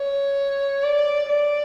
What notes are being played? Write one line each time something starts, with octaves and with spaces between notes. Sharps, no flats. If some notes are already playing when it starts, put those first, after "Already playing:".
Already playing: C#5
D5
D5